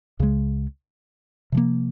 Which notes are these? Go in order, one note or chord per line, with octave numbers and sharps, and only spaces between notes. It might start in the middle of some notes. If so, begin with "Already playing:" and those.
C#2 C#3 F3 G#3
C3 F3 A#3